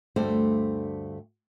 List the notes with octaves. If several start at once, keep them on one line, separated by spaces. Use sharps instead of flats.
D2 G2 A3 C5 G5